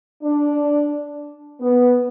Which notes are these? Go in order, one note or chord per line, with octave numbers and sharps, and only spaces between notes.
D4
B3